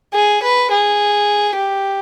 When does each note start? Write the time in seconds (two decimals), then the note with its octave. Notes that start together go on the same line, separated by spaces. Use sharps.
0.14 G#4
0.43 B4
0.71 G#4
1.56 G4